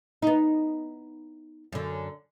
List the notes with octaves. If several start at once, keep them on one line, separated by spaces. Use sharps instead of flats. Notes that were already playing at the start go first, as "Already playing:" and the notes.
B3 D#4
F#2 D3